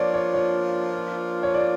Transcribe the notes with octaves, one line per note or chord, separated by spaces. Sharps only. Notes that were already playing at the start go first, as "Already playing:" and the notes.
Already playing: F3 A#3 D4 F4 C#5 D5
C#5
C#5
C#5
D5